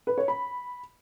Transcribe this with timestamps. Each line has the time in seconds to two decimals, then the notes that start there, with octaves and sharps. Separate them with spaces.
0.07 B4
0.18 C#5
0.28 B5